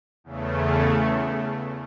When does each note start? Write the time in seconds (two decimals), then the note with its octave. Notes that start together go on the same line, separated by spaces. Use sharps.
0.24 E2 C#3 A3